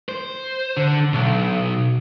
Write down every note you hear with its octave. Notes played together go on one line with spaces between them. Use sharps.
C5
D3
B1